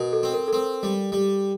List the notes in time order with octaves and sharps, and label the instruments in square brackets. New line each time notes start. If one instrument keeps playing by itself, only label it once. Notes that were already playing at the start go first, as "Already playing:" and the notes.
Already playing: [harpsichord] B2 [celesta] A#4
[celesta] A4
[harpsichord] C4
[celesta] A#4
A4
[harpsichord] C4 [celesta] A#4
[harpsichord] G3
G3